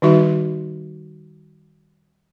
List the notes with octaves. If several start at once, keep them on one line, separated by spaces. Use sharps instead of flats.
D#3 G3 D#4 F#4 E5